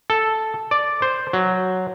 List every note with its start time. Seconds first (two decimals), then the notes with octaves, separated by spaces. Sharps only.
0.10 A4
0.71 D5
1.02 C5
1.33 F#3